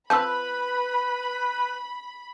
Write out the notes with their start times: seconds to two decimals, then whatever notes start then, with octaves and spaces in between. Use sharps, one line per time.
0.10 F3 C4 B4 A5 B5 E6 G6